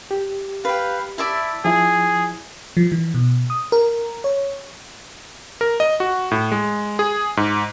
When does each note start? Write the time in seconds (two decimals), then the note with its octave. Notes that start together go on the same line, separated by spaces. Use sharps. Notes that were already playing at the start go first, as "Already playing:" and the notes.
0.11 G4
0.65 B4 F5 G5
1.18 E4 D5 E5 A5
1.65 F3 E4 G#4
2.77 F3
2.92 E3
3.14 B2
3.50 D#6
3.72 A#4
4.24 C#5
5.61 A#4
5.80 D#5
6.00 F#4
6.31 A2
6.52 G#3
6.99 G#4
7.37 G#2